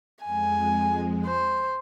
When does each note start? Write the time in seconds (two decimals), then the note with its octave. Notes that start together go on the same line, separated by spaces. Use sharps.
0.24 F2 G#3 G#5
1.26 C5